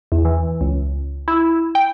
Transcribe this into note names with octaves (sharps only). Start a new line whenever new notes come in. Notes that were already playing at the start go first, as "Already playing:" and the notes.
E2
E3
C#2
E4
G5